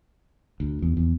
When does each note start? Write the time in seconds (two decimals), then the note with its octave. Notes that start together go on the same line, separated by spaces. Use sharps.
0.60 D2
0.82 E2
0.97 E2